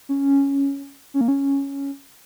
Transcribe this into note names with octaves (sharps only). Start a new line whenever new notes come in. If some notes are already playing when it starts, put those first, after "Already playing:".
C#4
C#4
A#3
C#4